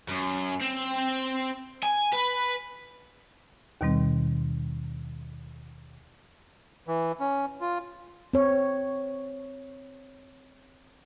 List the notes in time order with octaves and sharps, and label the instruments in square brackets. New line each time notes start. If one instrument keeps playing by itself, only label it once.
[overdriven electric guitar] F#2
C4
G#5
B4
[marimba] D#2 B2 D#3 G3 C4
[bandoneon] E3
C#4
F4
[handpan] C4 C#5